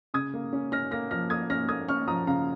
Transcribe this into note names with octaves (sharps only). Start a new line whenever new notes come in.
C#3 D#6 G#6
A#3
C#4
C#4 F6 A#6
A#3 F6 A#6
F3 F6 A#6
A#3 D#6 G#6
C#4 F6 A#6
A#3 D#6 G#6
C#4 C#6 F6
F3 A#5 D#6
C#3 F5 A#5